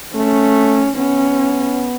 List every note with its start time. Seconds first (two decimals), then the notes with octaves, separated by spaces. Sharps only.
0.15 A3 C#4
0.96 B3 C#4